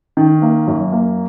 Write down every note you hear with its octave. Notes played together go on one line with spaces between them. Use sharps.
D#3
A#3
F#2
A#3